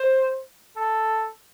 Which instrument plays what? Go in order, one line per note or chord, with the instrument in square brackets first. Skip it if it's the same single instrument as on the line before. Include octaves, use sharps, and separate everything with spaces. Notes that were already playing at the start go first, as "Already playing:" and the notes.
Already playing: [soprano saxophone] C5
A4